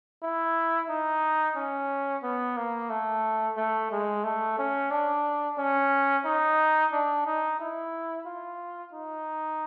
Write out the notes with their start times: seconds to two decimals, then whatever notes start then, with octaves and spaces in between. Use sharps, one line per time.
0.23 E4
0.90 D#4
1.56 C#4
2.23 B3
2.57 A#3
2.90 A3
3.57 A3
3.92 G#3
4.24 A3
4.58 C#4
4.91 D4
5.58 C#4
6.25 D#4
6.93 D4
7.26 D#4
7.60 E4
8.26 F4
8.93 D#4